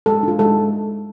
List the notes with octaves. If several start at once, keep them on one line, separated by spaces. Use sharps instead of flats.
G#3 A4
D4 F4
G#3 A4